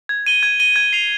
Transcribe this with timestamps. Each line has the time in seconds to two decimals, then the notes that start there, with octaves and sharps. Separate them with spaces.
0.09 G#6
0.27 D#7 G7
0.43 G#6
0.60 D#7 G7
0.76 G#6
0.93 C7 F7